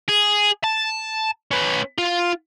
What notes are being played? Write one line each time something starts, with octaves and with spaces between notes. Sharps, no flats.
G#4
A5
C#4 B4
F4